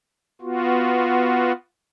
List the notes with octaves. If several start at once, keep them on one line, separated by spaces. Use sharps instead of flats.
B3 F4 F#4